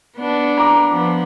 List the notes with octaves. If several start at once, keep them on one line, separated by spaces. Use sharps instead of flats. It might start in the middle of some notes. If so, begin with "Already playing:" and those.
B3 D4
A#5 D6
F3 B3